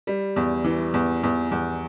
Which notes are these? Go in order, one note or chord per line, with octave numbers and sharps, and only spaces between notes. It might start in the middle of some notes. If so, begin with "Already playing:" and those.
G3
E2
E3
E2
E2
E2